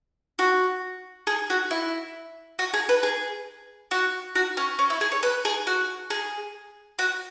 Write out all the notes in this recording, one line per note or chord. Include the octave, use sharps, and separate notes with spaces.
F#4
G#4
F#4
E4
F#4
G#4
B4
G#4
F#4
F#4
C#4
C#4
E4
G#4
C#5
B4
G#4
F#4
G#4
F#4